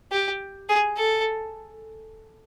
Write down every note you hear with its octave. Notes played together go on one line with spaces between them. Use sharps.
G4
G#4
A4